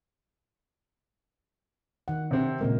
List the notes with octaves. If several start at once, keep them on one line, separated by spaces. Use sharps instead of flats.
D#3 F#5
C3 C4
A#2 C#3 G#3 A#3